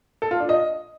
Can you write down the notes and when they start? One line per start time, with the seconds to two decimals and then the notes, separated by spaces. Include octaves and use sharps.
0.22 A4
0.31 F4
0.40 D4
0.49 D#5